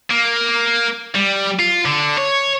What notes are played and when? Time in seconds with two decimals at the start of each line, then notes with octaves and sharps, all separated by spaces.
0.11 A#3
1.15 G3
1.59 F4
1.85 D3
2.17 C#5